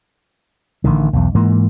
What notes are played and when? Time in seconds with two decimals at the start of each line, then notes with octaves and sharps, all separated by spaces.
0.84 A1 D3 D#3
1.13 B1 E2
1.35 G#2 E3 A#3